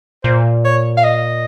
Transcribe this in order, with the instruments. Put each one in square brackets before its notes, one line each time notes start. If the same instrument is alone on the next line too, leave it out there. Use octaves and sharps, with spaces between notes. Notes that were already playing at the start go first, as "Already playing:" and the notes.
[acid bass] A#2 [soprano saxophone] C5
[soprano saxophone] C#5
F5
D#5